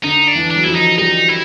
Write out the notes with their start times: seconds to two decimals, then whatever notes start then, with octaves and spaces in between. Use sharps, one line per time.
0.04 D3 D#4
0.28 D4
0.35 E3
0.50 D4
0.56 F#3
0.64 F3 E4
0.75 D#4
0.98 G3 D#4
1.28 E4